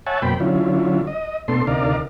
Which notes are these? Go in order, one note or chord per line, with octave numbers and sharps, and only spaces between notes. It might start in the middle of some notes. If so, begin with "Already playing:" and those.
C#5 E5 F#5 G#5 A5
F#2 B2 A#3 C5 G5 B5
D3 F#3 C#4 E4 F4
D#5
B2 A3 B3 D4 A4 C6
D2 C3 D#4 A#4 D5 F5